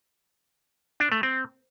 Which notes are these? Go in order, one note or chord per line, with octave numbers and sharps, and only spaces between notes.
D4
A3
C4